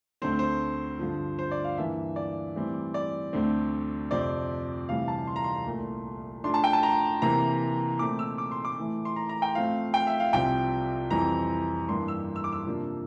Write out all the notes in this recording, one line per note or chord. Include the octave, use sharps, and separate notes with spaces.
D2 D3 A3 C4 C5
C5
G2 D3 F3
C5
D5
F5
G2 E3 A#3 D4 E5
D5
A2 E3 G3 C4
D5
D2 D3 A3 C4
F2 C3 F3 C4 D5
D2 C3 E3 G3 F5
A5
C6
A#5
C6
C2 A#2 A3
A2 F3 A3 D4 C6
A5
G5
A5
A#5
C3 E3 A#3 A#5
A#2 A3 C4 D6
E6
D6
C6
D6
A2 E3 A3
C6
A#5
A#5
G5
A2 F3 A3 C4 F5
G5
E5
F5
C2 C3 F3 C4 G5
F2 E3 G3 C4 A#5
G2 E3 G3 A#3 D4 C6
E6
E6
D6
E6
C3 F3 A#3 D4